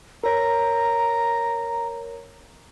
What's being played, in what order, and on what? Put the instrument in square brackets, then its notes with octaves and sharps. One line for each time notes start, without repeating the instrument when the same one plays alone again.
[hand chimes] A#4 C#5 [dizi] A#5